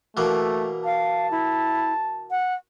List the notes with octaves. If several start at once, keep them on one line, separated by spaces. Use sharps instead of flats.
B2 E3 A3 A#3
F5 A5
E4
F#5